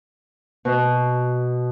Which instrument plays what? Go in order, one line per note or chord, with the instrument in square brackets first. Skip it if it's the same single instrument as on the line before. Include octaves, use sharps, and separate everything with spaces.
[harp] B2